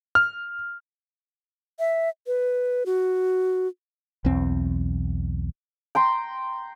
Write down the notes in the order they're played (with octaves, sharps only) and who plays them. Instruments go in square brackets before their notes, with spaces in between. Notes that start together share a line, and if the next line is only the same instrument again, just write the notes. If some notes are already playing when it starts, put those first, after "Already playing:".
[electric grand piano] F6
[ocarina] E5
B4
F#4
[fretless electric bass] B1 E2 C4
[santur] G5 A#5 C6